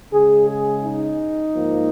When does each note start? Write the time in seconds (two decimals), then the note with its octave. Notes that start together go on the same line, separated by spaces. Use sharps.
0.12 C#3 G#3 G#4
0.48 G#4
0.84 D#4
1.55 G#2 F3 A#3